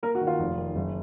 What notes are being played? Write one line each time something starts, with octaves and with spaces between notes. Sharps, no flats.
A#3 A#4
F#4
D#3
F4
F1
D#3
F#1